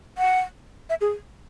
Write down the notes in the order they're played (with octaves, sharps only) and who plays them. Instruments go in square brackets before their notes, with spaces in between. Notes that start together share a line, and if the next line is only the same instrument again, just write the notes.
[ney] F#5
E5
G#4